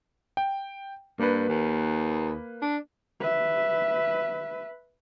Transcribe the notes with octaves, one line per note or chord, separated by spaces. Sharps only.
G5
G2 A#3 B4
D#2
D4
B4 E5